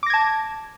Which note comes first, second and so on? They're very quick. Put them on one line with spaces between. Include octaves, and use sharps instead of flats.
D6 A#6 G#6 A5